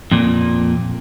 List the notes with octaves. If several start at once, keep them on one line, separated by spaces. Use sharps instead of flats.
F2 A#2